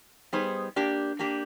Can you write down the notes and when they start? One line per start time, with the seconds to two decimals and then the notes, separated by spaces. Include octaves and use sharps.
0.33 G3 B3 D#4 G#4 C5
0.76 A#3 D4 G4
1.19 A#3 D4 G4